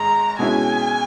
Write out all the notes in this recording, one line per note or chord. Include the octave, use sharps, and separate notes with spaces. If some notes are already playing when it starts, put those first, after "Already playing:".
Already playing: G#1 G#2 G#3 A#5
B2 G#3 C#4 E4 G#5